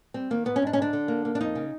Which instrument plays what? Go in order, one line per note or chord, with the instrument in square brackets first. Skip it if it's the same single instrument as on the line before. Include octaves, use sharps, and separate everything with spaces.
[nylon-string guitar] G3 C4
D#3 A#3
G#2 B3
C#4
G#2 D4
C#4
D3 D4
D3
A#3
A#3
D4
F2 D#4
C#3